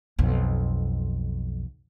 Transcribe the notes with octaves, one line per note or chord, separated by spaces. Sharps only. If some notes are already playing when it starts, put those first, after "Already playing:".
B1 F2